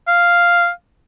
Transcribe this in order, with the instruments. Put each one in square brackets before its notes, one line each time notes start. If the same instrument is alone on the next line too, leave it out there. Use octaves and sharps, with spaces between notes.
[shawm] F5